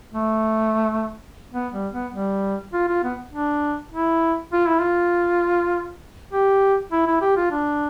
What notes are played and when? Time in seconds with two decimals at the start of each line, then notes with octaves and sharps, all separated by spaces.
0.14 A3
1.54 B3
1.74 G3
1.93 B3
2.13 G3
2.73 F4
2.88 F4
3.04 B3
3.33 D4
3.92 E4
4.53 F4
4.67 E4
4.81 F4
6.33 G4
6.92 E4
7.07 E4
7.21 G4
7.37 F4
7.51 D4